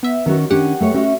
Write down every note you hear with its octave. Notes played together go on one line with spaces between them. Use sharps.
B3 E5
D#3 C#4 F#4
D#3 C#4 D4 G4 F#5
A3 B4 C#5
C#4 F#4 E5